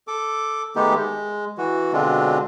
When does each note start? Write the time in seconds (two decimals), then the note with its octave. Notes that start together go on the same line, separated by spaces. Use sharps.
0.07 A4 D6
0.76 D#3 G#3 A3 B3 D#4 G4
0.95 G#3
1.58 E3 F#4
1.93 B2 D3 G#3 C4 D4 F4